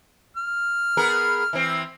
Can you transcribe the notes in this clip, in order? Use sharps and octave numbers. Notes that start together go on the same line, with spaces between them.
F6
B3 G#4 A#4
E3 C4